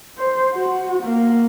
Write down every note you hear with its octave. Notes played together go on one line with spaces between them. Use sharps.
C5
F#4
A#3